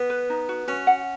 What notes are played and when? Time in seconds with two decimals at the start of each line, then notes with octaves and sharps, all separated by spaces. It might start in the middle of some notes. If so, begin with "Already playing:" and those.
Already playing: B3
0.10 B4
0.30 D#4
0.49 F#4
0.67 C#4 F#4
0.87 F#5